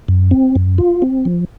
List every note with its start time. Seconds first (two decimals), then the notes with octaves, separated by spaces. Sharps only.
0.08 F#2
0.31 C4
0.56 F#2
0.78 F4
1.02 C4
1.25 F3